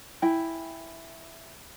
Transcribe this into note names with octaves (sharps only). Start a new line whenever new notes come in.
E4 G5 G#5